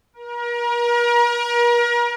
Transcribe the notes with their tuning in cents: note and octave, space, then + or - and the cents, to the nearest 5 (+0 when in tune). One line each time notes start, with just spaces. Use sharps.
A#4 +35